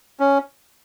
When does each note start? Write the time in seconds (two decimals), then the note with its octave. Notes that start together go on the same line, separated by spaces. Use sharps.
0.20 C#4